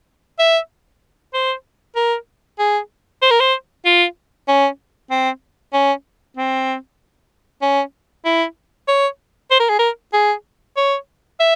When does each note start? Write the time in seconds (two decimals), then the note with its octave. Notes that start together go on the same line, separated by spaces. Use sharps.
0.39 E5
1.34 C5
1.96 A#4
2.59 G#4
3.22 C5
3.31 A#4
3.40 C5
3.85 F4
4.48 C#4
5.11 C4
5.73 C#4
6.37 C4
7.62 C#4
8.25 E4
8.88 C#5
9.51 C5
9.60 A#4
9.69 G#4
9.79 A#4
10.13 G#4
10.77 C#5
11.40 E5